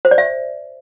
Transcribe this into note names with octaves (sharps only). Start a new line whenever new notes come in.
C5
D5
E5